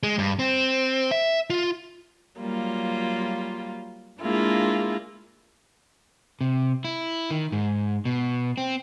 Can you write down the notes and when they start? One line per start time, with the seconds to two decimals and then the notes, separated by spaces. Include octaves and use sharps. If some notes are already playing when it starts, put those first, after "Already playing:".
0.03 G#3
0.19 G2
0.39 C4
1.11 E5
1.50 F4
2.38 F#3 G3 A#3 F4
4.22 G#3 A#3 D4 E4 F4 G#4
6.41 C3
6.85 E4
7.31 D#3
7.52 G#2
8.05 B2
8.58 C4